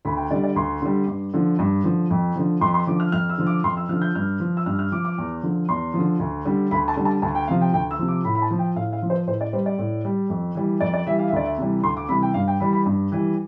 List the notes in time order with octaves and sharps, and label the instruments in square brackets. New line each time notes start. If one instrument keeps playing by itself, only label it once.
[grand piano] D2 B5
G5
D3 G3 D5
D5
D2 C6
D3 G3
G2
D3 F3
G2
D3 F3
F2
D3 F3
F2 C6
C6
D3 F3 D6
F6
F2 F6
E6
D3 F3
D6
F2 C6
E6
F3 F6
D3
G6
G2 F6
F3
E6
G2 F6
F6
F3 D6
D6
E2
D3 F3
E2 C6
D3 F3
D2
D3 G3
D2 B5
A5
D3 G3
A5
D2 A5
G5
C3 F3 F5
G5
D2 G5
E6
C3 F3
D6
A2 B5
B5
A5
F3
G5
A2 F5
F5
F3
C5
A2 C5
D5
G3 C5
D5
A2
G3
F2
E3 G3
F2 D5
D5
E3 G3 E5
F5
E5
D2 D5
E5
C3 E3 G3
D2 C6
D6
C3 E3 G3 B5
G5
G2 F5
G5
E3 G3 B5
B5
G2
E3 G3